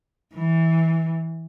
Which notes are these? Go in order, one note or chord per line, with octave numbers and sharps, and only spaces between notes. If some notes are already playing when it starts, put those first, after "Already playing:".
E3